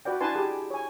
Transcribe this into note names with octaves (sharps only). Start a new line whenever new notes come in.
F#4 B4 D5 G5
D4 E4 B4 G#5 A5 C6
G4 G#4
C#5 G#5